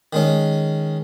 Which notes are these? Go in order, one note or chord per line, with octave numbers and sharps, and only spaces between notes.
D#3 G#3 C#4